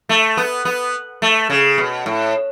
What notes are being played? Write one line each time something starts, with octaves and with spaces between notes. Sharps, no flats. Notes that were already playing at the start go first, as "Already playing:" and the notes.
A3
B3
B3
A3
C#3
B2
A2